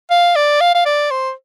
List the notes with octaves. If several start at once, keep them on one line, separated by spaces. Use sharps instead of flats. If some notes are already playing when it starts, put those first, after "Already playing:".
F5
D5
F5
F5
D5
C5